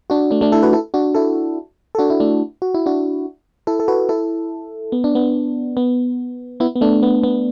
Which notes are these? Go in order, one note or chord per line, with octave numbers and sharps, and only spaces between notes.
D4 F#4
A3 D4
A3 D4
E4 A4
F#4 B4
E4 A4
D4 F#4
E4 A4
A4
D4 F#4
E4
A3 D4
F#4
E4
D4 F#4
E4 A4
A4
F#4 B4
E4 A4
B3
D4
B3
B3
B3 E4
B3
A3 D4
B3
B3